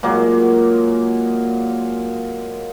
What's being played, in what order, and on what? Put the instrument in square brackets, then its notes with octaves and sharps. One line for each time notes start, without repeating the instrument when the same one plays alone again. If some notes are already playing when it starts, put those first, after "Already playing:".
[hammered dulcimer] A#2 F#3 G#3 A#3